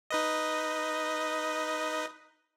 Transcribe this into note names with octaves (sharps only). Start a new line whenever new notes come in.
D#4 B4 D#5